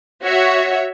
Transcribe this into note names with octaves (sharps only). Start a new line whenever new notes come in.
F#4 C#5 E5